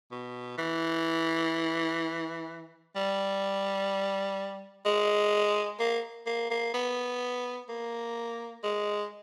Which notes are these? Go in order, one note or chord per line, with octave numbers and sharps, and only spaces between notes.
B2
E3
G3
G#3
A#3
A#3
A#3
B3
A#3
G#3